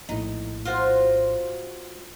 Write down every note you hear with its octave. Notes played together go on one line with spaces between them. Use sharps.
A#1 A2 D#4
F4 F#4 C5